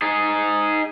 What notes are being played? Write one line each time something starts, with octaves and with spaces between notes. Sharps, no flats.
D#4 G#4